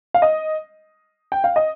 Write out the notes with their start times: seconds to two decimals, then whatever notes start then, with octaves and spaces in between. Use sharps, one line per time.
0.14 F5
0.22 D#5
1.32 G5
1.44 F5
1.56 D#5